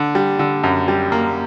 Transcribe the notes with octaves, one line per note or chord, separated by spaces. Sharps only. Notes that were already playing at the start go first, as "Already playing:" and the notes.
Already playing: D3
G3
D3
F#2
G3
A#3